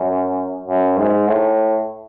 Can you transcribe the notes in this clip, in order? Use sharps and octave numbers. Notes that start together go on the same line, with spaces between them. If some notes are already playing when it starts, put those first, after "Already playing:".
Already playing: F#2
F#2
G#2
A2